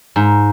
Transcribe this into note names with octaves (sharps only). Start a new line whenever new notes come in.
G#2